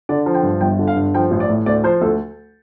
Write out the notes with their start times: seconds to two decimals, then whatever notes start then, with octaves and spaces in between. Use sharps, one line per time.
0.09 D3 D5
0.26 F3
0.34 G5
0.43 G2
0.61 G1 G5
0.79 D3
0.88 F5
0.96 G2
1.14 F3 G5
1.31 A1
1.40 D5
1.50 A2
1.66 D2 D5
1.84 F3 C5
2.02 D2 A4